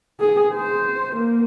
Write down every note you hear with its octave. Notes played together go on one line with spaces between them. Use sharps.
G#4
C5
A#3